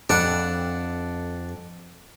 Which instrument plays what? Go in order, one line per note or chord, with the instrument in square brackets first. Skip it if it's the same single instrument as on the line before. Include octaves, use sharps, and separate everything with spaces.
[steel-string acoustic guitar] F2 A4 [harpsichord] D4 F#5